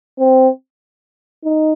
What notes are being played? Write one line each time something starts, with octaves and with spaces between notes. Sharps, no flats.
C4
D#4